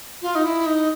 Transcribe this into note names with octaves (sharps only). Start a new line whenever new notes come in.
F4
D#4
E4
D#4